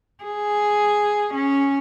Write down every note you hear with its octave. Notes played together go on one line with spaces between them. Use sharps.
G#4
C#4